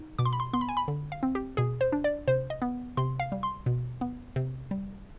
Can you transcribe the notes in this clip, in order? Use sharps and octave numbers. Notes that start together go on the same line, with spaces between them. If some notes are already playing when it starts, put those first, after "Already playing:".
Already playing: D#4
B2 D6
C6
B5
C6
B3 C6
B5
G#5
B5
D3
F5
C4
G4
B2 G#4
C5
D4
D5
C3 C5
D#5
B3
C3 C6
F5
G3
C6
B2
B3
C3
G3